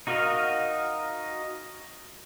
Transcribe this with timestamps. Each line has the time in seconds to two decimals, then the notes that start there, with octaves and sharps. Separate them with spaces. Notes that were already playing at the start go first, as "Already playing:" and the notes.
0.07 D#4 F#4 A#4 D#5 F5